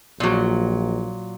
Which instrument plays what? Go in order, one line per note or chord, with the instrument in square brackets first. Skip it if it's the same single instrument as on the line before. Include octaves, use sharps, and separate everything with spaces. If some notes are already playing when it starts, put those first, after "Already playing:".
[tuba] A#1 [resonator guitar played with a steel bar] A#2 F#3